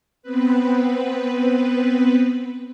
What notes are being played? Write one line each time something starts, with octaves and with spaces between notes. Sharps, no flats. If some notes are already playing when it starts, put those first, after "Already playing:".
B3 C4 B4